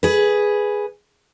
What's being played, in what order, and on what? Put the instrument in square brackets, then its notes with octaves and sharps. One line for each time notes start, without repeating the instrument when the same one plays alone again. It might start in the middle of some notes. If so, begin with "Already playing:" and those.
[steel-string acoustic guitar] G#4 B4